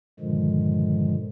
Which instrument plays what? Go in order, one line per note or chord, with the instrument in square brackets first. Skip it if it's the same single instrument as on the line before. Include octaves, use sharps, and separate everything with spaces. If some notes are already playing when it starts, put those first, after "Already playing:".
[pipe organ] G2 A#2 D3 D#3 F3 G#3